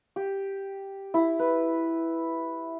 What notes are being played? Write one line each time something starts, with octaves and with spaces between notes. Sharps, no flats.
G4
E4
B4